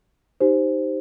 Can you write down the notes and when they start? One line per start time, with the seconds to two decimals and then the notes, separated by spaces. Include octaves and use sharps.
0.40 D#4 G4 C5